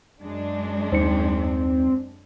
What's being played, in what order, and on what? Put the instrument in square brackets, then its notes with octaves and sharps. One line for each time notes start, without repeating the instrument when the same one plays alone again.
[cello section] F#2 G#3 D4
[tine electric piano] D#2 D#4 C#7 [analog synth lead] C4